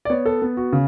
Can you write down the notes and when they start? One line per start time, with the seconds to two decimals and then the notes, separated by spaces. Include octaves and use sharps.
0.05 D5
0.09 B3 C#5
0.25 A4
0.42 B3
0.57 F#4
0.73 C#3